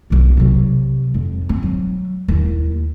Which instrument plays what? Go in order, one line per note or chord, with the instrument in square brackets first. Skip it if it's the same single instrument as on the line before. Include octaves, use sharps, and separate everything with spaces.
[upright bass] B1 A#3
C3 F#3
F2
C4
F#3
D#2 E4